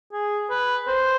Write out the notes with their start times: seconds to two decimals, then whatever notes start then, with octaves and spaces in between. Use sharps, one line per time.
0.13 G#4
0.50 B4
0.87 C5